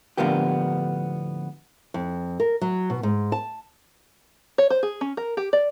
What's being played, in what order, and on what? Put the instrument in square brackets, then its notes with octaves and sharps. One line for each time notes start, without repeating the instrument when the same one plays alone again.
[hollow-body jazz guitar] A2 D3 F3 A#3 B3 G4
[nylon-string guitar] F2
A#4
F#3
B2
G#2
A5
[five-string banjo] C#5
C5
G#4
C#4
A#4
G4
D5